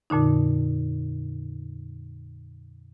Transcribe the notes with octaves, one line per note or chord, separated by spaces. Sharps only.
F2 A#2 D3 D#4